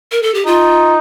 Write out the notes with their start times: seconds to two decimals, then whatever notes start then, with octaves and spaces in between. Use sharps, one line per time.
0.12 A#4
0.23 A4
0.34 G4
0.46 D#4 F4